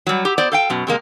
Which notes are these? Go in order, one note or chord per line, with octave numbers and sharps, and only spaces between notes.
F#3 G3
G4
B3 C5 D5
A4 F5 G5
F#2 B2
C3 G#3 A#3